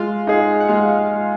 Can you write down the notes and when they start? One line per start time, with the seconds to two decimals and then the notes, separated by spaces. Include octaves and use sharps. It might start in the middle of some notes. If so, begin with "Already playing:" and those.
Already playing: G#3 F4 F5
0.27 D#4 G#4
0.60 F#5
0.68 G#3 F4 F5